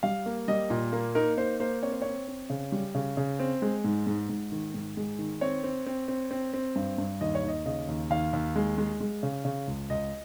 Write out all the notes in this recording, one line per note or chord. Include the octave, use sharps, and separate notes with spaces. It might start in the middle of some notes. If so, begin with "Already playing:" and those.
G3 F5
A#3
G3 D#5
A#2
A#3
D#4 A#4
A#3 C5
A#3 C5
C4 C#5
C5
C4 C#5
C4
C#3
G3
C#3
C#3
C4
G#3
G#2
G#2
G#2
D#3
G#2
G#3
D#3
C4 C#5
C4
C4
C4
C4
C4
G2
G2
D#2 D#5
C#5
D#2 D#5
C#3 D#5
D#2
D#2 F5
D#2
G#3
G#3
G#3
C#3
C#3
C#2
C#2 D#5